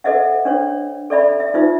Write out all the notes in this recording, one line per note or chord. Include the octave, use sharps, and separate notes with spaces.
A4 C5 D#5 E5 F#5
D4 C5 C#5
A4 D5 E5 B5
E5
D#4 F4 C5 E5